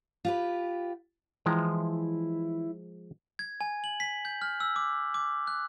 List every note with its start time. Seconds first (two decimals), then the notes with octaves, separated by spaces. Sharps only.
0.25 F4 G4 B4
1.46 E3 F3 G#3 E4 G5 A#5
3.39 G#6
3.61 G#5
3.84 F#7
4.00 B6
4.25 G6
4.42 F6
4.60 E6
4.76 D6
5.14 D6
5.47 F#6